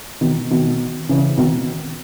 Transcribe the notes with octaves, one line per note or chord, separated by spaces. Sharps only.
B2 D#3
B2 D#3
C#3 E3
B2 D#3